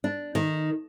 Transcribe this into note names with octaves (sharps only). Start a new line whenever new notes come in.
D4
D#3